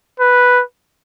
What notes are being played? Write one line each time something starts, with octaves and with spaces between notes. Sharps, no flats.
B4